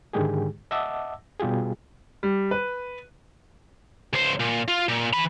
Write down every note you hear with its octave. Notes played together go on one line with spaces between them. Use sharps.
G#2 D3 D#3 G#3 G4 G#4
D#5 E5 F#5 A5 D6 E6
B2 G3 F4 G4 G#4
G3
B4
C#2 C5
A#2
F4
A#2
E3 B5